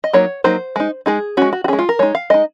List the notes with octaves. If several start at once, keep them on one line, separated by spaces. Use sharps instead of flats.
D#5
F#3 A#3 D#4 C#5
F#3 A#3 D#4 C5
G#3 D#4
G#3 D#4 G#4
G#3 C#4 F#4
F#4
F#4
G#3 C#4 G#4
F4
A#4
G#3 D#4 C#5
F5
G#3 D#4 D#5